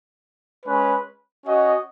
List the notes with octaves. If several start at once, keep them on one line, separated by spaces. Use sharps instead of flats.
G#3 C#4 B4
C#4 F#4 D#5